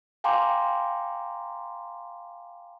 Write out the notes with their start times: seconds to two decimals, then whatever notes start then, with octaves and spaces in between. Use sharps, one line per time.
0.24 F5 G5 G#5 A#5 C6 D6